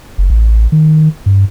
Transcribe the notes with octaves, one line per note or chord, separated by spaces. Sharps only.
F#1
A1
D#3
G2